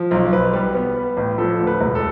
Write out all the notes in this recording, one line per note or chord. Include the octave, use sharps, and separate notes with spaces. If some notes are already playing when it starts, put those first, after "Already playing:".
Already playing: F3
B1 C5
B1 B4
G3 B4
B3
B3
A1
F3 A4
D2
B4
E1
A4